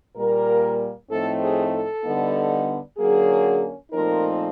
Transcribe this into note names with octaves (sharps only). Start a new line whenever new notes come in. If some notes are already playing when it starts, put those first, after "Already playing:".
A#2 G3 A#3 A#4
A2 F3 A3 C4 D#4 A4
G#4
A4
D3 G3 B3 D#4
D3 F#3 A#3 C#4 G#4
A#2 F3 A3 C4 D#4 A#4